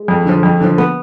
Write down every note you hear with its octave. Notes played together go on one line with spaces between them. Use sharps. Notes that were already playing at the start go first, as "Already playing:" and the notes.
Already playing: G#3
F2
D3 F3
F2
D3 F3
B3